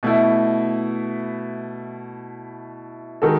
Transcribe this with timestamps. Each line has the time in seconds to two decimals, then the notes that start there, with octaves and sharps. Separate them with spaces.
0.03 B2 A3 E4
3.22 D#3 G#3 D#4 F#4 A4